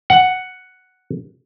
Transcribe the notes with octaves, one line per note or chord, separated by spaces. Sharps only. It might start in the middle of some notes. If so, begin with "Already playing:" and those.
F#5